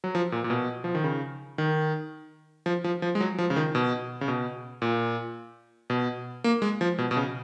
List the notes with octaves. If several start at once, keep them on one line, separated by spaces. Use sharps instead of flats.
F#3
F3
A#2
A#2
B2
F3
D#3
C#3
D#3
F3
F3
F3
G#3
F#3
F3
C#3
D#3
B2
C#3
B2
A#2
B2
A#3
G#3
F3
B2
B2
C#3